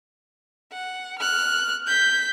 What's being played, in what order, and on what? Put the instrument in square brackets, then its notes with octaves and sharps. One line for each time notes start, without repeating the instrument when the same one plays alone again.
[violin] F#5
F6 F#6
G6 B6